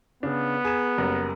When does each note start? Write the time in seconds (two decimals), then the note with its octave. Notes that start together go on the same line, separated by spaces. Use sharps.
0.23 C#3 B3 D4
0.65 G#4 A#5 E7
0.98 F#1 G3 A#4